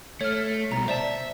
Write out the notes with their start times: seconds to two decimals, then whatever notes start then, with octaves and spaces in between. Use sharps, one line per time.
0.21 A3 C#5 F6
0.71 C2 B2 A#5
0.88 C5 D5 E5 A5